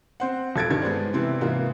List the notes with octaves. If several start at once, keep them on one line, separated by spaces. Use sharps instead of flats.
C4 C5 F#5
D#1 A4 G#6 A6 D7
G2 D#3 G#6
G#3 B3 C5 D5
C3 E3 C4 E4
G#2 C3 E3 A#3 F4